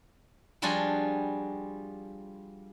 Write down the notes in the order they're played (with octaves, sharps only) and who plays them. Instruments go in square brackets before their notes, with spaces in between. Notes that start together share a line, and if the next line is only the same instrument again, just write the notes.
[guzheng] F3 G3 D4 F4 F#4 G#4